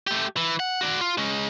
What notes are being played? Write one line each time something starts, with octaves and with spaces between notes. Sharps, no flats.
A3 G4
E3
F#5
F#4 D5
F4
G#3 C#4